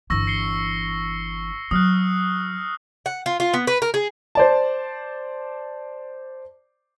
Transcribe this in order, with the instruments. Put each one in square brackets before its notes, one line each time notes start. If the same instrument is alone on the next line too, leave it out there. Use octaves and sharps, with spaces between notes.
[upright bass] G1 E3 [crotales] C#6 E6 A#6
[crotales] C7 C#7 G7
[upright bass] F#3 [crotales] D#6 F6 F#6
[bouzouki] F#5
F4
F4
B3
B4
A#4
G#4
[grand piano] C5 D5 A5